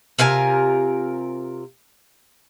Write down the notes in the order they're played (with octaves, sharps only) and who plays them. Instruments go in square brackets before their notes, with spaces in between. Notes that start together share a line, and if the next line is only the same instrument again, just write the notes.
[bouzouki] C3 F4 A#4 G#5